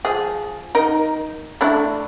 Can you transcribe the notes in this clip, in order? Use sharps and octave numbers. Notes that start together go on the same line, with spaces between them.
F3 G#4
D#4 A#4
A3 D4 E4